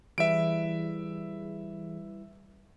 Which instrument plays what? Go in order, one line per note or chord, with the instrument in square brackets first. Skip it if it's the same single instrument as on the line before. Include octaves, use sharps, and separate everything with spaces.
[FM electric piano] E3 G#4 [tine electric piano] G3 E4 B4 [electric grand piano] E5 D7